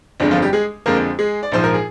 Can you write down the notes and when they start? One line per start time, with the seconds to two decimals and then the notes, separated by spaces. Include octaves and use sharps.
0.20 G1 F2 D3 G#3 D4
0.31 F3 F4
0.42 G3 G4
0.53 G#3 G#4
0.86 F2 D3 F3 G#3 A#3 A#4
1.19 G#3 G#4
1.43 D5
1.52 A#1 G#2 F3 C5
1.64 A#4
1.74 G#4